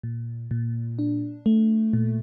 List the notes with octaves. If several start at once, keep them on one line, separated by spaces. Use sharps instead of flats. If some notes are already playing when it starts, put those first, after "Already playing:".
A#2
A#2
D4
A3
A#2